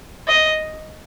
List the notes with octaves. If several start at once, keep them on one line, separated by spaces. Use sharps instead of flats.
D#5